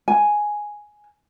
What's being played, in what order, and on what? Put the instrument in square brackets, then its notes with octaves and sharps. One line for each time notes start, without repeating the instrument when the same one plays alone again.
[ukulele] G#5